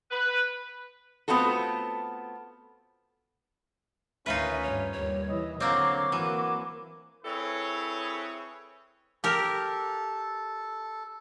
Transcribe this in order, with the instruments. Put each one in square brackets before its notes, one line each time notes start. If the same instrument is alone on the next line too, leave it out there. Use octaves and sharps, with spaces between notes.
[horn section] B4
[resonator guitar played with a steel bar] A3 B3 C4 F4 F#4 A4
[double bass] D2 D#3 [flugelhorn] C#4 [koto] D#4 F4 B4 [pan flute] E5
[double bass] G2 [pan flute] C#5
[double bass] D#2 G3 [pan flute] C#5
[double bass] E3 [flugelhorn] D#5
[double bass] D3 [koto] F#3 A#3 C4 [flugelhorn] C#5 [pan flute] D6
[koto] E3 [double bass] F#3 A#3 [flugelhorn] F#4
[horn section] C4 E4 G#4 A4 B4 C#5
[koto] G4 A#4 [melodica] A4